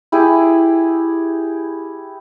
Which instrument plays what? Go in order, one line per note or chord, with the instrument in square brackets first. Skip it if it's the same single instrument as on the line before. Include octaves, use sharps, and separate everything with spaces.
[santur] E4 G4 G#4